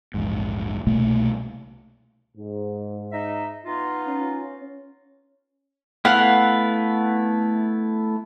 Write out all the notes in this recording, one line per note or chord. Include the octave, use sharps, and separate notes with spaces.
A#1 E2 G#2
C2 B2 A3 A#3
G#2
D#4 E5
B3 D#4 F4
C#4
A3 B3 E4 F5 F#5 F6